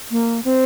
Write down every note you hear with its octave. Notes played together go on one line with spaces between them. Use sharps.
A#3
C4